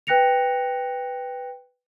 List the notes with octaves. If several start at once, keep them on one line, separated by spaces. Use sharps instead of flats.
B4 G5 F#6 A#6 C#7 F7